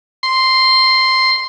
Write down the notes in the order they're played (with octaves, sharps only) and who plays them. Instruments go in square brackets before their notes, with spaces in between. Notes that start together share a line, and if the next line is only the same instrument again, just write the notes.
[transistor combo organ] C6